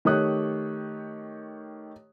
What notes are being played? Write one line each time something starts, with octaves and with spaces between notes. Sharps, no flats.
D#3 A3 G4 C#5 D#6 F#6